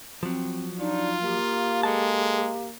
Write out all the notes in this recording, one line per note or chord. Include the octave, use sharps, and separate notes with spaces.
F3 F#3 C4
D4 D#4 F4
A#3 G4
G#3 A4 A5